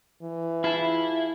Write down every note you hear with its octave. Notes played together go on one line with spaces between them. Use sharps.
E3
E4 F4 G#4 A5